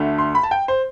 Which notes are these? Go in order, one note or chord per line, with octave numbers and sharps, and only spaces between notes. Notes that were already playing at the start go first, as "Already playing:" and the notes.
Already playing: D2 D3 A3
C6
B5
A5
G5
C5